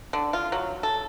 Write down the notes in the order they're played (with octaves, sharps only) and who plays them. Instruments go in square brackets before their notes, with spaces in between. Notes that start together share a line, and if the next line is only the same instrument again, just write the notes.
[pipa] D3
F4
F#3
A4